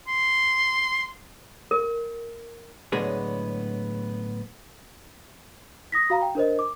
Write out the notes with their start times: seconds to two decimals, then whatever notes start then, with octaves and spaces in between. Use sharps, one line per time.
0.08 C6
1.71 A#4
2.92 A2 D3 F#3 G#3 B3 G#4
5.92 D#6 A#6 B6
6.10 F#4 F5 A#5
6.22 G5
6.35 D4 A#4 C5 D#5
6.59 D6